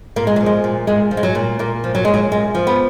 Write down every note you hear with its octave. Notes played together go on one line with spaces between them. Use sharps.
A#2 A#3
G#3
F#3
F3
G#3
A#2
A#2 G#3
F3
G#3
F#3
A#2
A#2 A#3
F3
F#3
A#2 G#3
F#3
F#2 G#3
F3
B3